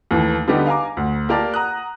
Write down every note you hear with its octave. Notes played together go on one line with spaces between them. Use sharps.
D#2 E3 A3
D3 G3 B3 D4 D#4 G4
F5 G#5 A#5 D6
D2
A#3 G4 A#4 D5 A5
F#5 A#5 D#6 F#6